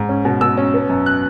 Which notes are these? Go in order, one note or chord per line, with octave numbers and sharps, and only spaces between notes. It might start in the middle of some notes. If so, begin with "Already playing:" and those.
Already playing: G#2
C#4
B2
B2 E6
C#4
B3
F#2
F#6